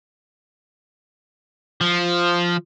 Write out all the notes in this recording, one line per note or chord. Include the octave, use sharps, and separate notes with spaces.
F3